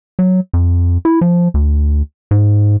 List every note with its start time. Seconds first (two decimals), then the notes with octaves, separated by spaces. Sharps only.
0.19 F#3
0.54 F2
1.05 E4
1.21 F3
1.54 D2
2.31 G#2